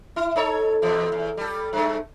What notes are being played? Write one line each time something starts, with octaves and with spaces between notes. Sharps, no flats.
E4
D#4 A4 C#5
E2 B2 F3
E2
G3 A4
G2 A3